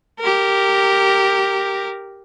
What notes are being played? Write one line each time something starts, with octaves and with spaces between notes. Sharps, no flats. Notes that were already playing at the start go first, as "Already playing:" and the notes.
G4 A#4